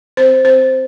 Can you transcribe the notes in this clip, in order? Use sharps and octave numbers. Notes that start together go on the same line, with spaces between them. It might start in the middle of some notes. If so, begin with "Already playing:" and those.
C4 C5
C4 C5